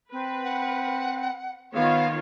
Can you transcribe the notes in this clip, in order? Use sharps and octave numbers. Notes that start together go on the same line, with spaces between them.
C4 B4
F#5
D#3 B3 F4 C#5 F5